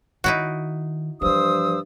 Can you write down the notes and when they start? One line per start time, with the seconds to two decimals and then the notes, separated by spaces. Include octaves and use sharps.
0.24 D#3 D#4 E4 F#4
1.22 G2 E3 F3 C5 D#6 E6